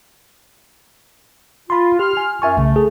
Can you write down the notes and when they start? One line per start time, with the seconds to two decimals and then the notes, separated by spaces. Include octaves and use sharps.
1.70 F4 B5 C6
1.99 G4 C6 F6
2.17 G#5
2.42 F#2 F4 E5 G#5 C#6
2.57 C2 C#3 A3
2.76 G#4 A4